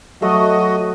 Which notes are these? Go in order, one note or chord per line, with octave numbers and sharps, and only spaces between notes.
F#3 A3 F#4 D#5